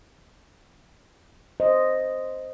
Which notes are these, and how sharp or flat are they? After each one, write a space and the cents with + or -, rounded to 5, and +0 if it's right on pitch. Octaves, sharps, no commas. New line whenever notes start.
C5 +0 D#5 -5